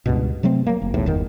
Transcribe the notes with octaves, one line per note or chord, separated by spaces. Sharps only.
C#2 G2 B2
C3 F#3 A3 C4
F#3 A#3
F#1
B1 E2 A2
G1 E2 D#3 B3